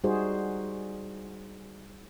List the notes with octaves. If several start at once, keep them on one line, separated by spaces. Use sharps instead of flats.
G3 D#4 F#4 G#4 C5